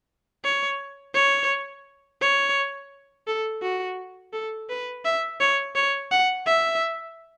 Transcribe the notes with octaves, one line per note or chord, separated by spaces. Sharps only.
C#5
C#5
C#5
A4
F#4
A4
B4
E5
C#5
C#5
F#5
E5